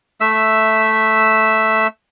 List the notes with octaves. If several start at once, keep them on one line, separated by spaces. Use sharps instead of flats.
A3 E5 E6